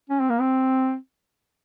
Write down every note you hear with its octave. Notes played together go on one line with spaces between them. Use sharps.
C#4
C4
A#3
C4